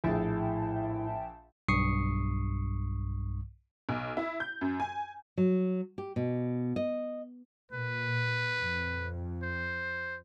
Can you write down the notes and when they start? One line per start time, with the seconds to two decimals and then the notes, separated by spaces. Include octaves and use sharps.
0.04 A#1 A2 E4 G#4 E5 G5 A5
1.68 B1 G2 C#6 D#6 C7 C#7
3.89 B1
4.17 E4
4.40 G6
4.61 F#2
4.80 G#5
5.38 F#3
5.98 G4
6.16 B2
6.76 D#5
7.72 A#2 B4
8.59 F2
9.43 C5